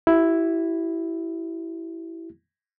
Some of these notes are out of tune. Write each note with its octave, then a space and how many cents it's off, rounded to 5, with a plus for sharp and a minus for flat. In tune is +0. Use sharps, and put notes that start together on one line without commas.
E4 +0 G4 -40